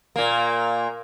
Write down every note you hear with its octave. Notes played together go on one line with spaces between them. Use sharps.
A#2 A#3